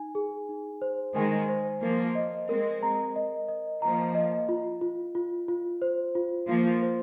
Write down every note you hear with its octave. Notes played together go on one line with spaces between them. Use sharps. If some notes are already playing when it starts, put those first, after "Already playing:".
Already playing: D#4 G#5
G#4
D#4
C5
D#3 G#3 G#5
C5
F3 A#3 A#4
D#5
G#3 C4 A#4
A#5
D#5
D#5
F3 A#3 A#5
D#5
F4
F4
F4
F4
C5
F4
F3 A#3 F4
C5